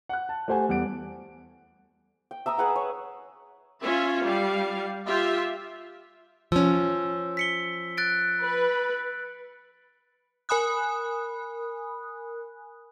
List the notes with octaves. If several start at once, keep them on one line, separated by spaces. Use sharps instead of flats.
F#5 F#6
A5
A3 G4 C5 F#5 G#5
E2 G3 F#5 D7
G5
E5 A#5 D#6 E6
G#4 B4 F#5
C#5
C#4 F4 E5
G3 F5
F4 G4 E5
F3 C#4 E6
B6 C#7 G7
F#6 A6 D7
B4
A#4 G#5 B5 D#6 F#6